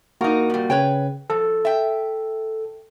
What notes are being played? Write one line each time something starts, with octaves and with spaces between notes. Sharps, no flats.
A#3 D#4 F#4 A#4
A#2 G3
C#3 B4 C#5 G5
F3 A4
E5 G5